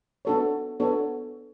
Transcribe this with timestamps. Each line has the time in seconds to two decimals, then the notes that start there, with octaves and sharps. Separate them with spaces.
0.25 B3 D4 F#4 A4 C#5
0.80 B3 D4 F#4 A4 C#5